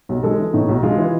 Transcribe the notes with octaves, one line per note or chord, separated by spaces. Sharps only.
B1
G#3 A4
E3
A2 D#4
B1
G#3 F4
E3